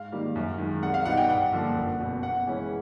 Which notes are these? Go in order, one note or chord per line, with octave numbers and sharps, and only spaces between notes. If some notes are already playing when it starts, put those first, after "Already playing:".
Already playing: G#2 F5
D#3 G3 A#3
F#2
D#3 G#3
C2 F#5
F5
B2 G3 B3 D#4 F#5
G5
G2 F#5
D3 F3 A#3
F#1
E2 B2
E2 F#5
C#3 E3 G#3 C#4